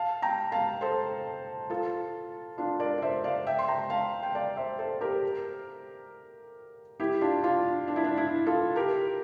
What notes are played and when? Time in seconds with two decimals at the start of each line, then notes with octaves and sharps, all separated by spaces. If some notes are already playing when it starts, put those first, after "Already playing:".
Already playing: F5 A5
0.22 G5 A#5
0.52 F5 A5
0.81 A4 C5
1.70 F4 A4
2.58 D4 F4
2.80 A#4 D5
2.98 D5
3.02 C5 E5
3.24 D5 F5
3.47 E5 G5
3.59 C6
3.68 G5 A#5
3.90 F5 A5
4.23 G5
4.35 D5 F5
4.57 C5 E5
4.79 A4 C5
5.01 G4 A#4
7.00 E4 G4
7.21 D4 F4
7.43 D4 F4
7.88 D4
7.96 E4
8.04 D4
8.17 E4
8.46 F4 A4
8.76 G4 A#4